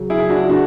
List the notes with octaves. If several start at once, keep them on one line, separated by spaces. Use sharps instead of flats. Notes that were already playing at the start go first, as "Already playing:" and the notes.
Already playing: C#3 F#3
E4 G#4
D4 F#4
C#3 D4 F#4